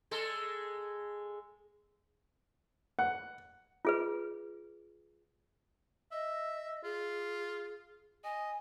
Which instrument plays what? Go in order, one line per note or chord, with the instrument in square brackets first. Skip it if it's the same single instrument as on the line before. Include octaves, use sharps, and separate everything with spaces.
[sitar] G#3 A4
[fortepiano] F#5
[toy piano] F4 G#4 B4
[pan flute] D#5 [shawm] E5
[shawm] F4 [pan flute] G#4
[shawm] D#5 [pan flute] G#5